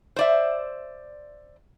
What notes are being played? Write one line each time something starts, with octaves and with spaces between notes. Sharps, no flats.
C5 D5 E5